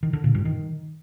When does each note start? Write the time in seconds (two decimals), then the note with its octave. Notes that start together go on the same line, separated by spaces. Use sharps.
0.03 D#3
0.13 D3
0.24 A#2
0.35 G2
0.45 D#3